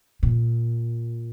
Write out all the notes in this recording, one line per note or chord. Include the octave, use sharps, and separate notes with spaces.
A#2